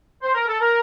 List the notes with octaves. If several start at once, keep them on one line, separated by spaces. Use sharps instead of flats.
C5
A#4
A4
A#4